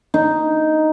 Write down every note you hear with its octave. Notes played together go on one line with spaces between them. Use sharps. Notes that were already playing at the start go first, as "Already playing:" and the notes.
D#4